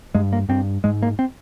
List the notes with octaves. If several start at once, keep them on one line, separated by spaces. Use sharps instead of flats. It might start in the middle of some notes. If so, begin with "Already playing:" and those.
G2 G#3
A#3
G2 C4
G#2 G#3
A#3
C4